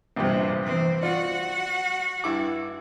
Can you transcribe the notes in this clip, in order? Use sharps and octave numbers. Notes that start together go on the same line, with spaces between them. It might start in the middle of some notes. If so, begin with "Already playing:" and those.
A#1 E2 G2 C3 G4
E3 C4
F4 F#4 D5 F#5
G2 E4 D6